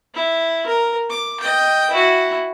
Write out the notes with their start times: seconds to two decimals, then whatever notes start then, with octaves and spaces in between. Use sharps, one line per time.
0.14 E4
0.66 A#4
1.10 D6
1.40 D#5 G5
1.90 E4 F#4